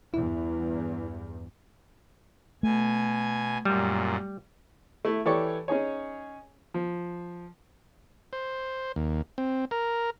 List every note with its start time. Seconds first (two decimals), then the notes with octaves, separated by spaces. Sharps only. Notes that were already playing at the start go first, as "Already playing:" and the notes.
0.14 E2 G2 E4
2.63 B2 A3 G#5
3.65 F#2 A#2 G3
5.05 A3 E4
5.26 E3 G4 A4 C#5 D5 C#6
5.68 C#4 D#4 G#4 C#5
6.74 F3
8.33 C5
8.96 D#2
9.38 C4
9.71 A#4